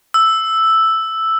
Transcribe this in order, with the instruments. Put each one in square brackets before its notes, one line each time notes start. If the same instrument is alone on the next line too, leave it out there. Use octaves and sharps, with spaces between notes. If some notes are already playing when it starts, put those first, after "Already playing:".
[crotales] E6